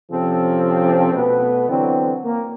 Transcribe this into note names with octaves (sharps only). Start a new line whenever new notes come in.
C3 F3 C4 C#4 A4
B2 A3 B3 B4
D3 E3 F#3 C4
A#3